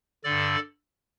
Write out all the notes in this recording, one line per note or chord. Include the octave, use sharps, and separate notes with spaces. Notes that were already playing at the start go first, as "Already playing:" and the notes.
G2 D3 A4 D5